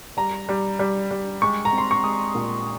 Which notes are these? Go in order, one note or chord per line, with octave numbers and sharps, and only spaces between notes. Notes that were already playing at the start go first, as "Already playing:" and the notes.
G3 A#5
G3
G3
G3
G#3 C#6
A#5
C4
C6
C#6
G#3 D#6
A#2